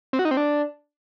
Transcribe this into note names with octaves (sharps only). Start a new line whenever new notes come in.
C4
F#4
D#4
C4
D4